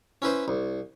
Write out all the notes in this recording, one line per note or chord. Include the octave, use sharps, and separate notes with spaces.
C#4 E4 B4 C5
C2